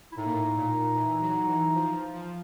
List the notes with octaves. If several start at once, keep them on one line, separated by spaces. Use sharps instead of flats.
E4
A2 D#4
A#2
A2
A#2
E3
F#3
E3
F3
F3